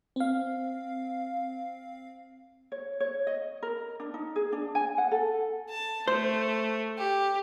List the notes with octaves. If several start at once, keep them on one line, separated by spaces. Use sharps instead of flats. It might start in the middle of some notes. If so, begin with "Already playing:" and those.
C4 F5
C#5
C#5
D#5
A#4
D4
D#4
G#4
D4
G#5
F#5
A4
A5
A3 C5
G4